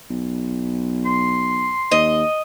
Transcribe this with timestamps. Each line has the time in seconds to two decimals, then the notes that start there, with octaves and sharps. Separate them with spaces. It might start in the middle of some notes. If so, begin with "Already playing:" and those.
0.10 B1
1.06 C6
1.91 D#2 D#5